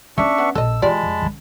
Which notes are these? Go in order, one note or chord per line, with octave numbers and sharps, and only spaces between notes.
A3 C#4 D4 E5 C#6
B3
A#1 A4 D#5 E6
E3 G#3 F4 G4 D5 A5 B5
F1
D3 C#4